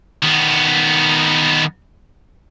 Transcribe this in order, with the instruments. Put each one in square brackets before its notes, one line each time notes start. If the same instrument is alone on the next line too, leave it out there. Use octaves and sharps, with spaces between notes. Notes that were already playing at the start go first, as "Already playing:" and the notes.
[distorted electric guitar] D#3 B3